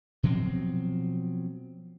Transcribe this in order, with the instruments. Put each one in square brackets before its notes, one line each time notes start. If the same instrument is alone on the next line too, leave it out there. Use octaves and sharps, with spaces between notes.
[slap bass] B2 F3 F#3 C4